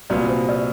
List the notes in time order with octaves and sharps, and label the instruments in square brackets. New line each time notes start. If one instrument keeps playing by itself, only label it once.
[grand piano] C2 A#2 F#3 B3 [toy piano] D5
[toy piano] C5
D5